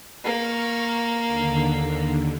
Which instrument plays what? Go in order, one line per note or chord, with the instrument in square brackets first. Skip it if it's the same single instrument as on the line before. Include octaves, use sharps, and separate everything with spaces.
[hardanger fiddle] A#3 [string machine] C#6 F6
[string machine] D#2 D3